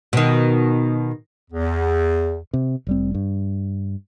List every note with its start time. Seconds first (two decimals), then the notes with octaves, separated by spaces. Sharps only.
0.13 B2 D#3
1.51 E2
2.53 C3
2.87 F1 G3 C4
3.14 G2